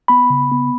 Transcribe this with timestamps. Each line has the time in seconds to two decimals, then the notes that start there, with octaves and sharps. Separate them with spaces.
0.08 B3 B5
0.30 C#3
0.52 B3